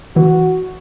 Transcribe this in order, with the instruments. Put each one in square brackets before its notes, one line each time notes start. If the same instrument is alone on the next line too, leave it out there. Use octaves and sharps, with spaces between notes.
[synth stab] E3 [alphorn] F#4